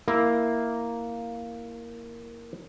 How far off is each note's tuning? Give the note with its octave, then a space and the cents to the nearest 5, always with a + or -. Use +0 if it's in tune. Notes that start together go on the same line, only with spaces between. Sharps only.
A#3 +0 E4 +0